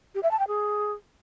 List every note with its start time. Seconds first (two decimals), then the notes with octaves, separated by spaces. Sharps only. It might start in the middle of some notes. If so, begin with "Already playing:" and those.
0.15 G4
0.23 E5
0.31 A5
0.39 G5
0.48 G#4